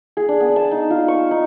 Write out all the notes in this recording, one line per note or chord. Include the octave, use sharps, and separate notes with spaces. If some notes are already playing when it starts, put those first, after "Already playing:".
G#4
D4
B3
A5
D#4
F4
C#6
D#4